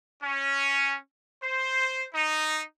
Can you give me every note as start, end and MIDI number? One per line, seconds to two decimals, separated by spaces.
0.22 0.96 61
1.44 2.05 72
2.14 2.61 63